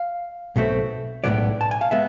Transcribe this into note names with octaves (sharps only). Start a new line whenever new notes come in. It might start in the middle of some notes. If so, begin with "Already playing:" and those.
Already playing: F5
B1 B2 A3 C4
B1 A2 E3 G#3 B3 D5
A5
G#5
F5
G#3 B3 E5